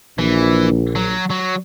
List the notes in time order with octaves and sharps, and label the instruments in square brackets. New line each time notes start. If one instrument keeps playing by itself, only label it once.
[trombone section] A#1 [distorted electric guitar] E3
[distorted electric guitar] F#3
F#3